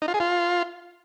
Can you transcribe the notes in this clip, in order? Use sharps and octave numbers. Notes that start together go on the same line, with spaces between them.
D#4
F4
G#4
F4